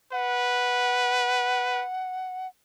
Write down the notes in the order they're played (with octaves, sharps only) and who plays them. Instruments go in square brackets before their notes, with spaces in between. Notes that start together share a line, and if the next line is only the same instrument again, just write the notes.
[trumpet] B4 [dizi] F#5